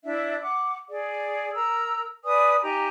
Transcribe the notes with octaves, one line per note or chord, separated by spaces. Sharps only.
D4 E4 E5
F#5 D6
G#4 D5
A#4 A#5 E6
B4 D5 G#5 D#6
D#4 G4 G#5 A#5